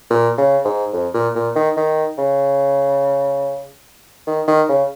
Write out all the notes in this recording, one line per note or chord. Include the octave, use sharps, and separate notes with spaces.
A#2
C#3
G#2
F2
A#2
A#2
D#3
D#3
C#3
D#3
D#3
C#3